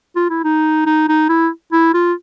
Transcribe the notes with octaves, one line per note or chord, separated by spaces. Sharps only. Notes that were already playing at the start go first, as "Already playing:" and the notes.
F4
E4
D#4
D#4
D#4
E4
E4
F4